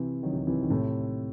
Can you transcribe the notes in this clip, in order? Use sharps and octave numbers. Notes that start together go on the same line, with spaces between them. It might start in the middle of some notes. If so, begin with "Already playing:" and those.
Already playing: C3 E3
D#3 F#3
C3
D#3
C3 E3
D#3
A2 C3